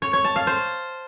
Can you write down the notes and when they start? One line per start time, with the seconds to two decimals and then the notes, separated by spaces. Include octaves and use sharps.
0.02 C#5
0.13 C#5
0.25 A5
0.36 F5
0.47 C5